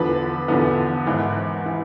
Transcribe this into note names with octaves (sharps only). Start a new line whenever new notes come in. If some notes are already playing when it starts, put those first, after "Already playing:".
Already playing: E2 D3 F3 B3 B4
E2 D3 F3 B3
G#1 G#2 E3
E3